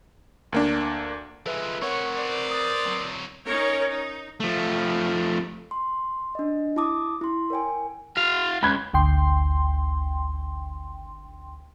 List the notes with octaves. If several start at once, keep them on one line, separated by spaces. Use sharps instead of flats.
D2 A#3 D4
F3 G#3 A4 B4 E5
C4 A#4 C#5 F#5 C#6 G#6
B4 C5 D5
D#6 A6
F#3 C4
C#4 D#4 A#4 C#5
D#4
F3 A3
C6
D4 D#5
E4 A5 D6 D#6
E4 C6
A#4 C#5 G5 G#5
F#4 F5
C#2 B5 F#6 G#6
G#1 D2 G5 C6